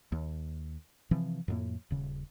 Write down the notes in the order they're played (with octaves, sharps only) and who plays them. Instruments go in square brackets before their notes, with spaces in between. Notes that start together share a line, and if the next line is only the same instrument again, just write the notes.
[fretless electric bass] D#2
C3 E3 F3 C4
F2 A2 A#3
D#1 C#3